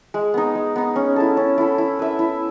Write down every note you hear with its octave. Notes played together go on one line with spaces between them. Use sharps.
G#3
B3 D#4
G#3
B3 D#4
C#4
E4 A4
C#4
E4 A4
E4
B4 E5
E4